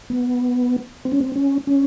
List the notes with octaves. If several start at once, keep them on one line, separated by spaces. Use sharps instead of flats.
B3
C4
C#4
C4
C#4
C#4